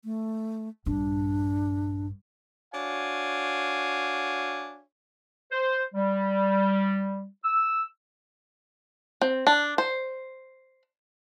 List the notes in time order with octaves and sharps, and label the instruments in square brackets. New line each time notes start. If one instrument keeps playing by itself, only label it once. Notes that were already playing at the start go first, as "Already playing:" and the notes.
[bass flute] A3
[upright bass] A#1 G2 [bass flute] D4
[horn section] D4 F#4 C#5 F5 G#5
[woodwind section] C5
G3
E6
[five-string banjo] C4
D4
C5